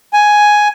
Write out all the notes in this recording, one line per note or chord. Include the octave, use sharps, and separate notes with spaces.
G#5